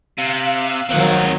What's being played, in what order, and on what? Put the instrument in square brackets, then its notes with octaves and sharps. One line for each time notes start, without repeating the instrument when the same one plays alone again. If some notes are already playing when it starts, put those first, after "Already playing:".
[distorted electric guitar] C3 [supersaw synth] F5 E6 F#6
[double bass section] G#1 D#3 F#3 [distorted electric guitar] C4 F#5